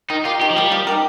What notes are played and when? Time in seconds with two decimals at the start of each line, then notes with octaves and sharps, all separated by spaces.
0.10 D#3 D#4
0.25 A#3 F4 G4
0.41 D#3 G4
0.51 F3
0.56 G3 A#3 G4
0.72 F3
0.87 D#4 G4 A#4